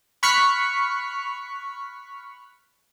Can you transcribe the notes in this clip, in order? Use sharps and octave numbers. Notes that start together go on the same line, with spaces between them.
B5 C#6 F6 F#6 B6 C#7